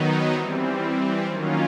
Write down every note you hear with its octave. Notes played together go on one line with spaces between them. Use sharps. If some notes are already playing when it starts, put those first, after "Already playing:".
Already playing: D#3 F#3 B3 D#4
E3 G3 C4
D#3 F#3 A#3 C#4 F4